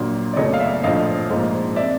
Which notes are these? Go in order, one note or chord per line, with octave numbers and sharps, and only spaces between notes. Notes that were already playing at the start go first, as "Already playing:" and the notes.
Already playing: A#1 A#2 F#3 A#3
D5
F#1 E2 C#3 F#3 A3 C#5 D#5
F5
D5 E5
A#1 A2 F3 D#5 F5
A#1 G#2 F3 A#3
C3 D5 E5